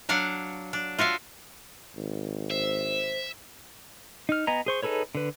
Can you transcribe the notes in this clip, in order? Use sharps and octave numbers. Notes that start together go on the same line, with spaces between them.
F#3 D4 F5 F#5
D4
F4 F#4 E5 F5
G#1
C5 E5
D#4 F6
B3 D#5 G#5 A#5
G#4 C5 C#6
D#4 G#4 A4 B4 C#5
D3 B4